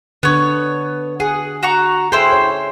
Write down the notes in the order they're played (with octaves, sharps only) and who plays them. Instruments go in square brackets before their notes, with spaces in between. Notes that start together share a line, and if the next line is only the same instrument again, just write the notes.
[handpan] D3 D4 [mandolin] B3 C#5
[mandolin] G#4 [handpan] F#5
[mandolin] F#4 A#5 C#6
[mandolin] E4 C5 G5 [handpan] G#4 A4
[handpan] C#5